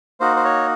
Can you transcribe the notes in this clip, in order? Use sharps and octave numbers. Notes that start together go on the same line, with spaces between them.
A#3 D#4 F#4 C5
C5
C#5